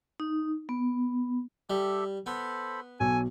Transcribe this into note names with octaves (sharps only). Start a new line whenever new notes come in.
D#4
B3
G3 G4 A4 E5
B3 A4 C5 B5
B1 A4 C#5 G#5